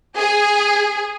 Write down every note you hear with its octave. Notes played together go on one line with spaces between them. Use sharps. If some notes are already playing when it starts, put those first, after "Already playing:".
G#4